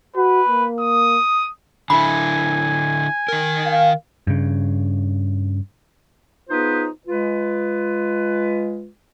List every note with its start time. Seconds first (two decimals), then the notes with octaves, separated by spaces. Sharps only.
0.16 F#4 B4
0.49 A#3
0.81 D#6
1.90 D3 E4 G#5 B5
3.28 D#3 A#4
3.66 F5
4.27 G2 C#3
6.49 B3 D#4 F4 G#4 B4 C5
7.06 G#3 F4 B4